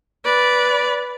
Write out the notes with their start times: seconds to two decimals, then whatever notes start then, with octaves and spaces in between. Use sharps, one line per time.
0.25 B4 D5